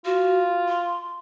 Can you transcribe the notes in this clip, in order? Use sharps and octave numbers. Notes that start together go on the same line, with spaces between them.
F4 F#4
C6